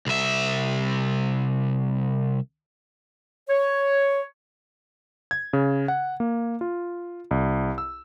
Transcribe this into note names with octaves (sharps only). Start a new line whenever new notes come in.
C2 E5
C#5
G#6
C#3
F#5
A#3
F4
C2
E6